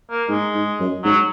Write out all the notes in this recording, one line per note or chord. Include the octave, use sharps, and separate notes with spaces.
A#3
G#2 G#3
G#2
F#2
G#2 F#3